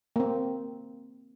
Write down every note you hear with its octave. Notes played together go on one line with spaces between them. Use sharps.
A#3 C4